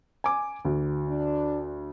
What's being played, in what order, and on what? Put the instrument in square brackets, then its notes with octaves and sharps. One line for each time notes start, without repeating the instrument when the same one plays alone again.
[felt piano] G#5 D6
D2
[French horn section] D4